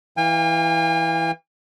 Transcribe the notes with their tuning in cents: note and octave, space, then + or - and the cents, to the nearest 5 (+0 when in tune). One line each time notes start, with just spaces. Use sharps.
E3 +0 F5 +0 G#5 -45